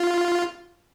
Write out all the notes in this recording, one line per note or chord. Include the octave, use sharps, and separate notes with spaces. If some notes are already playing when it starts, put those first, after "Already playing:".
Already playing: F4